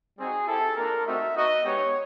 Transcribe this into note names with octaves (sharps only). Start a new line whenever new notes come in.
G3 C4 D#4 F#4 G#4
C4 E4 G4 A4
A#3 D4 F4 A#4
A3 C4 D#4 F#4 E5
B3 D#4 F#4 D#5
G#3 B3 D#4 G4 C#5